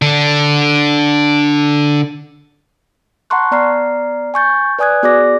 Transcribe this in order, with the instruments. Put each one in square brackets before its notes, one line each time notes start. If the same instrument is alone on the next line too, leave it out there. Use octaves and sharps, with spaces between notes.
[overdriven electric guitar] D3 D4
[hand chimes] F#5 A5 A#5 C6 C#6 F#6
B3 D5 A#5 F6 C7
G#5 C#6 G6 A6
B4 D5 G#5 D#6 F#6 G#6
B3 F#4 G#4 D5 D6 A#6